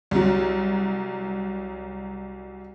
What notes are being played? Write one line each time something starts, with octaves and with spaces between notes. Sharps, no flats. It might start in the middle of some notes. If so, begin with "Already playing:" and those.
C2 F#3